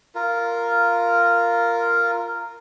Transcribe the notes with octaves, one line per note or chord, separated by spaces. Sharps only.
F4 A#4